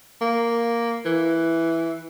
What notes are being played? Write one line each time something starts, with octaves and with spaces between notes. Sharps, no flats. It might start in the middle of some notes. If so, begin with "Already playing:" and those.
A#3
E3